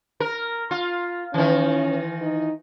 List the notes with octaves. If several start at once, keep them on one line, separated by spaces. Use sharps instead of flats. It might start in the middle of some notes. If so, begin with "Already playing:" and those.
A#4
F4
D#3 E3 C#4
D#4